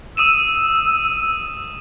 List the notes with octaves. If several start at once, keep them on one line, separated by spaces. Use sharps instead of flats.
D#6 E6 D#7 E7